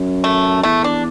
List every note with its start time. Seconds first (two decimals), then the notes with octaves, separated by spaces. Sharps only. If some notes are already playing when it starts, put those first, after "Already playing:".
Already playing: F#2
0.24 A3
0.63 E2 A3
0.84 D4